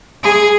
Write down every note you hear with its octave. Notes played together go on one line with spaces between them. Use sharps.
G#4